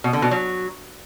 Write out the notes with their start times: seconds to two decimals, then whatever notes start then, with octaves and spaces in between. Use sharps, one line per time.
0.04 B2
0.13 D3
0.22 B2
0.31 F#3